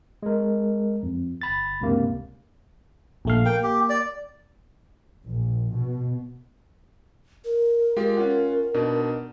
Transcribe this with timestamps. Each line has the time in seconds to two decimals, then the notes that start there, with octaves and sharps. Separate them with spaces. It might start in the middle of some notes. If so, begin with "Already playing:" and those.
0.23 G#3 A#4
1.03 F2
1.42 G1 B5 A6
1.81 C#2 G2 C3 A#3
3.25 A#1 A3 F5
3.46 A#3 G5
3.63 G4
3.90 D5
5.27 A#1
5.72 B2
7.45 A#4
7.97 G#3 F4 G4 A#4
8.17 C#4 F4 F#5
8.74 B2 D4 D#4